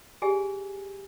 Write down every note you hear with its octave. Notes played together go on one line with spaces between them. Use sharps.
G4 G#4 G#5